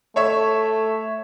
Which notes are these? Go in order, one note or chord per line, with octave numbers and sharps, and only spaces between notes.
A3 C#5 E5 C#6